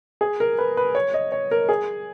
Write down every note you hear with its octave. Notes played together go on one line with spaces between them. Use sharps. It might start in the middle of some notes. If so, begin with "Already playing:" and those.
G#4
A#4
B4
B4
C#5
D#5
C#5
A#4
G#4